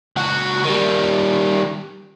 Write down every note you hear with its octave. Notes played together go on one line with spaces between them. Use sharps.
C#2 F#4
D#3 G3